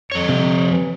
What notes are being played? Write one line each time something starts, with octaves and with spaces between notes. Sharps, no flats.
F2 F3 C#5
C3
E3